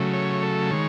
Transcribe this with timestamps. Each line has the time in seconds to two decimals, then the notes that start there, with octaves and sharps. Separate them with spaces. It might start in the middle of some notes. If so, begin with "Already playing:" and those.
Already playing: C#3 F#3 A3
0.13 C#5
0.43 A4
0.71 D#3 G#3 C#5